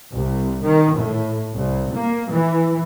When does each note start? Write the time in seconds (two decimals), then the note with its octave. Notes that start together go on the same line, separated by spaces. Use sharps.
0.13 C2
0.64 D#3
0.97 A2
1.54 C2
1.95 A#3
2.30 E3